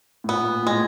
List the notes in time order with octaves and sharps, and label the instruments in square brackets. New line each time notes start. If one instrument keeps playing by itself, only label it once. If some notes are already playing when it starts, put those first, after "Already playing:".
[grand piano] A2
[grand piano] A#2 [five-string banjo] B3
[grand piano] A#2
[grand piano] A2 [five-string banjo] G#3